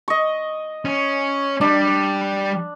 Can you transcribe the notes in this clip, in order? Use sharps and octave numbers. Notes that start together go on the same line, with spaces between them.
D#5 C#6
C#4
G3 D4